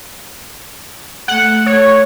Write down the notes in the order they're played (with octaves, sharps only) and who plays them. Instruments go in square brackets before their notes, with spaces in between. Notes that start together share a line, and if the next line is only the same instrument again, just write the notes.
[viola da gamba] A3 [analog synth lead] F#5
[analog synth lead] C#5